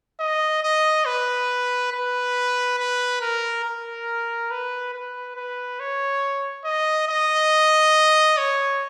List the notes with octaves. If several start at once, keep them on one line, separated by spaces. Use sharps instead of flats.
D#5
D#5
B4
B4
B4
A#4
A#4
B4
B4
B4
C#5
D#5
D#5
C#5